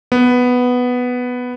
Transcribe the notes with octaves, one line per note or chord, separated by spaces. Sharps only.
B3